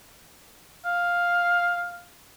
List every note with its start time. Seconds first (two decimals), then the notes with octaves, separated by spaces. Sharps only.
0.85 F5